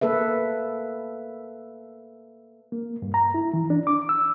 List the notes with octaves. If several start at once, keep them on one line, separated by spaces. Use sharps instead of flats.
A#3 A4 B4 E5
A#3
G2
A#5
E4
E3
D4
D6
E6